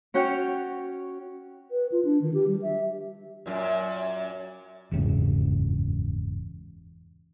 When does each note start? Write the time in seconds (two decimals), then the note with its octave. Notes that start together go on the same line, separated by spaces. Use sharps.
0.14 C#4 F#4 C#5 G5
1.71 B4
1.92 F4
2.05 D4
2.22 D#3
2.34 G4
2.48 G3
2.62 E5
3.46 F#2 A#2
4.91 F#1 E2 G#2 C#3